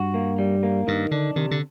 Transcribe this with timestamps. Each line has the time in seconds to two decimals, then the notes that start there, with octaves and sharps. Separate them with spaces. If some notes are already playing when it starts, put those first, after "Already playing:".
Already playing: G2 F#4
0.14 A#3
0.38 G3
0.63 A#3
0.87 G2 D#3
1.11 D3 D4
1.36 C3 D#3
1.51 D3